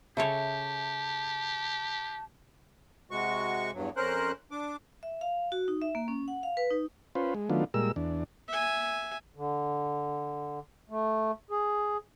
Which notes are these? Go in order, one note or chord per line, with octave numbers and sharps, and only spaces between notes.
C#3 G4 A4 C#5 E5 A5
C3 G#3 F#4 C#6
E2 G2 F#3
F2 C#4 A#4 C5 F#6
D4 D6
E5
F5
F#4
D#4
E5
A#3
C#4
F#5
F5
B4
D#4
C#4 F4 B4 C5
G#3
D#3 F#3 A3 B3 D4 F4
A#2 G3 G#3 A#4 E6
E2 D4
E5 G#5
D3
A3
G#4